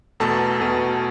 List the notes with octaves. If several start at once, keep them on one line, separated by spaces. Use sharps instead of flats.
E2 B2 A3 A4 A5
E2 B2 A3